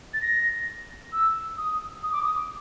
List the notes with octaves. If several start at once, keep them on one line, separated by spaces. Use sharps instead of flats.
A6
A#6
E6
D#6
D#6
D6
D#6